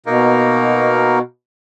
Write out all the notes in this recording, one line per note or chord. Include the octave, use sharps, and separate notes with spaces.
B2 A#3 D#4 A#4